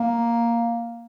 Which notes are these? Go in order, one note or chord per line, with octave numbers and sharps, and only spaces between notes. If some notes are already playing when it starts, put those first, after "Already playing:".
Already playing: A#3